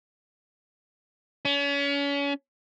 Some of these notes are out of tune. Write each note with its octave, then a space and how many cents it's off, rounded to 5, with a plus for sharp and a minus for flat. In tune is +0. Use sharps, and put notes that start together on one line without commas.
C#4 +35